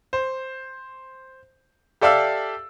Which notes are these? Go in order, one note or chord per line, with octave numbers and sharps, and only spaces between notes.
C5
G4 A4 D5 E5 F5 E6